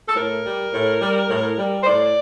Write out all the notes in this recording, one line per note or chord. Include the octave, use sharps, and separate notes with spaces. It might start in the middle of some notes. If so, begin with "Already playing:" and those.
A4
A2 A#4
G3
A2
G3
A2
G3
C5
A2 D5